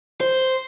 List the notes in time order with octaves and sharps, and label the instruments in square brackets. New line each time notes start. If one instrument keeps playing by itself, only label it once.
[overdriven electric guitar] C5